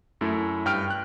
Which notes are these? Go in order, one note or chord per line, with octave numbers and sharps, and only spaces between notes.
F#2 A3 E4
G2 G5 F6 D7
F#6